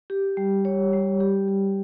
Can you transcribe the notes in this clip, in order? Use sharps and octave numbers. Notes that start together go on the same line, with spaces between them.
G4
G3
C#5
G3
G4
G4